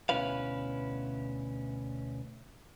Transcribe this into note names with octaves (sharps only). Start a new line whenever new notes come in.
D2 B2 C#4 E4 B4 F5